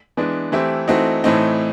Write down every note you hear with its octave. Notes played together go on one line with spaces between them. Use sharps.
E3 G#3 B3 D4
E3 A3 C4 E4 G4
E3 A3 C4 D#4 F#4
A2 E3 A3 C4 D#4